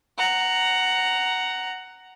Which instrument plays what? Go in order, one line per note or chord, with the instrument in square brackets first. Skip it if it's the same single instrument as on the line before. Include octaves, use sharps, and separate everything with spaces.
[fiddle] F#5 A#5